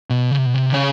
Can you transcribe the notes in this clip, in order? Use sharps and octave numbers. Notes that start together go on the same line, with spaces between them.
B2
C#3
C3
B2
C3
C#3